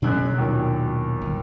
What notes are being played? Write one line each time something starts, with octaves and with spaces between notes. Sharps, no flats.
F#1 F#2 B2 D4 F#6
D#2 A#2 F#3
G1